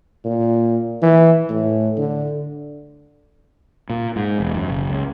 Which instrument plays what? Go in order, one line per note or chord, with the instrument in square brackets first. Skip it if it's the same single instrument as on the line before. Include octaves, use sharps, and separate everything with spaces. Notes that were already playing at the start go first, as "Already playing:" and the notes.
[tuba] A#2
E3
A2
D3
[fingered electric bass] A#2
G#2
E1
F#2
F#1
C#2